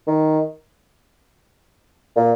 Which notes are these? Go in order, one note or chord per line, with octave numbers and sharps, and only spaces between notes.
D#3
A#2